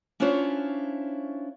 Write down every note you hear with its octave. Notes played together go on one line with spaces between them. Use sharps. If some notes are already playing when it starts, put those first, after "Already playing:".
C#4 D4 E4 F4 C5 C#5